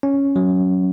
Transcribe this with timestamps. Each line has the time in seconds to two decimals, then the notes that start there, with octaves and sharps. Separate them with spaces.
0.03 C#4
0.36 F#3